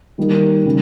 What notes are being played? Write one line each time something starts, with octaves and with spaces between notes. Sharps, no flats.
D#3 G3 A#3 D#4
C#3 G3